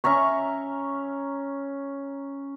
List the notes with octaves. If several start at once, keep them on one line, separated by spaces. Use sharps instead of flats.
C#4 E5 A#5 C#6